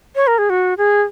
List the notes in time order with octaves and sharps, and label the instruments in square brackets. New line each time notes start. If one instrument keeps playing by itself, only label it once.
[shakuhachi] C#5
A#4
G#4
F#4
G#4